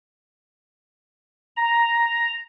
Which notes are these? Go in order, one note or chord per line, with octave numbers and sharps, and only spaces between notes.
A#5